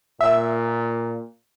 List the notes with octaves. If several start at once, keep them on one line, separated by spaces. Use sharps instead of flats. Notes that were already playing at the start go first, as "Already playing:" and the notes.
A#2 E5